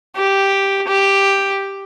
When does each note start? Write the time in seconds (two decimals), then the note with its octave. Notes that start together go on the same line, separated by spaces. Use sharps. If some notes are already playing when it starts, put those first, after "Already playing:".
0.16 G4
0.87 G4